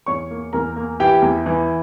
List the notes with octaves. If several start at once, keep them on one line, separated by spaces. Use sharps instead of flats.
E2 C#5 C#6
A#3
E2 A#4 A#5
A#3
E3 G4 G5
E2
E3